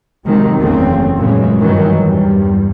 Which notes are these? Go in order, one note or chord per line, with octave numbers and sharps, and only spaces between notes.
C3 D#3 F#3 G#3 C4
F#1 E2 C#3 A3 C4
F#2 A#2 C#3 E3 G#3
G2 D#3 E3 F#3 G#3
E2 G2 G3